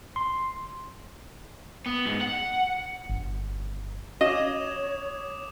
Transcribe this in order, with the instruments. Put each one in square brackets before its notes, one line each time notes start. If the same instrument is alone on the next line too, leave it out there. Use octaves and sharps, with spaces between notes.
[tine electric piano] C6
[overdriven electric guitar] B3
G#2
F#5
[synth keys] G1
[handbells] C#4 F#4 F5 [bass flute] C#5 [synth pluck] D#5 [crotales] D6 D#6 E7